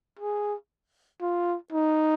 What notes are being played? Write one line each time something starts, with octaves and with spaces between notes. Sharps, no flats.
G#4
F4
D#4